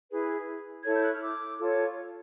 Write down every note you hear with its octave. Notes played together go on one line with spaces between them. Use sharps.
E4 G#4 B4
E4 A4 C#5 G#6
G6
F#6
F6
D6 E6
F4 A4 C#5